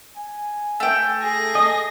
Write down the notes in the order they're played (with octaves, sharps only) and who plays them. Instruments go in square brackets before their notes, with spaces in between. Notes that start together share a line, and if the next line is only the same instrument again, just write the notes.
[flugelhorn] G#5
[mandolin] A3 G5
[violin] G#4 A#6 [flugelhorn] A4
[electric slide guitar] D#5